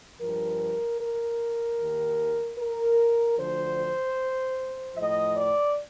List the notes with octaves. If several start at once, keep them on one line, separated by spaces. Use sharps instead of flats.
G2 F3 A#4
A#4
D#2 D#3
A#4
D2 D3 F3 C5
A2 F3 D#5
D5